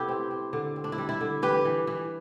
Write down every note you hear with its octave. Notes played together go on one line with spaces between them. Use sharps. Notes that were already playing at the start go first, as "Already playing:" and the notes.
Already playing: C3 B3 E4 G4 A4
C4
C4
D3
C4
D4
E4
G3
E4
D3
E3 G4 B4
E3
E3